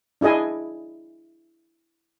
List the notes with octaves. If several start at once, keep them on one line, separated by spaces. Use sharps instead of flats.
D4 E4 G#4 D#5 G#5